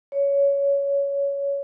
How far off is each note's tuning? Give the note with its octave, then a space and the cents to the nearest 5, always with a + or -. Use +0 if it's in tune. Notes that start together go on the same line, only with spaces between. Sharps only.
C#5 +15